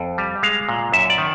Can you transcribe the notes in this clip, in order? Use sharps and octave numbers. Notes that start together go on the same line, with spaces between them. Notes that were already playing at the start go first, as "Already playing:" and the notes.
Already playing: F2
G3
G#3 F5
A#2
F#2 E5
D5
D#3